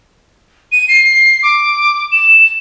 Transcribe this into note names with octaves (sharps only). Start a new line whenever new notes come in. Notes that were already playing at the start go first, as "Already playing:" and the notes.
D#7
C7
D6
E7